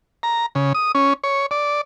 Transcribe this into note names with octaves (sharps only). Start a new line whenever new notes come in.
A#5
C#3
D#6
C#4
C#5
D5